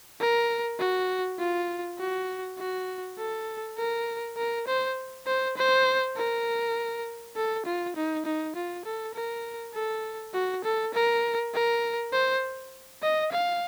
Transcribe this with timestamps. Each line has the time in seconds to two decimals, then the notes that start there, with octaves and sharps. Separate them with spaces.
0.20 A#4
0.79 F#4
1.39 F4
1.99 F#4
2.58 F#4
3.18 A4
3.78 A#4
4.37 A#4
4.67 C5
5.27 C5
5.57 C5
6.17 A#4
7.36 A4
7.66 F4
7.96 D#4
8.25 D#4
8.55 F4
8.85 A4
9.15 A#4
9.74 A4
10.34 F#4
10.64 A4
10.94 A#4
11.54 A#4
12.13 C5
13.02 D#5
13.32 F5